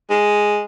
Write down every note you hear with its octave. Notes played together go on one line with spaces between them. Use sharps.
G#3